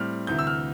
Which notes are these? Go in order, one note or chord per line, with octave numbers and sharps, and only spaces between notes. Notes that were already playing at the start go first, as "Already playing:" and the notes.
Already playing: A2 G3 C4 F6
D2 C3 E3 G6
E6
F6